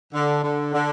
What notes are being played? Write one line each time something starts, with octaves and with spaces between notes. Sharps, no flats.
D3
D3
D3